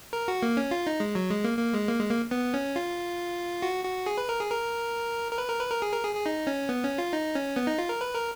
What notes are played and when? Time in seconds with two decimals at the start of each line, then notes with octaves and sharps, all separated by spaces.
0.13 A#4
0.28 F#4
0.43 A#3
0.57 C#4
0.71 F4
0.87 D#4
1.00 G#3
1.15 F#3
1.30 G#3
1.44 A#3
1.59 A#3
1.73 G#3
1.87 A#3
1.99 G#3
2.10 A#3
2.31 B3
2.54 C#4
2.76 F4
3.62 F#4
3.85 F#4
4.06 G#4
4.18 B4
4.29 A#4
4.39 G#4
4.50 A#4
5.32 A#4
5.38 B4
5.49 A#4
5.60 B4
5.70 A#4
5.82 G#4
5.92 A#4
6.04 G#4
6.15 G#4
6.26 D#4
6.47 C#4
6.69 B3
6.83 C#4
6.98 F4
7.13 D#4
7.35 C#4
7.56 B3
7.67 D#4
7.78 F4
7.89 A#4
8.01 B4
8.15 A#4